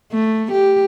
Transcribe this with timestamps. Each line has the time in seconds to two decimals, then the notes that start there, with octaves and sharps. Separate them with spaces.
0.12 A3
0.52 G4